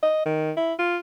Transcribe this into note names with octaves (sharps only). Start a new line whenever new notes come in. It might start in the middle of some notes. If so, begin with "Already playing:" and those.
D#5
D#3
E4
F4